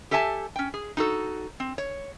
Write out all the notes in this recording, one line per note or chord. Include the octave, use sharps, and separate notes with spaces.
G4 A4 E5 G#5 A5
C#4 G5
G#4
D#4 F#4 A4
C4
C#5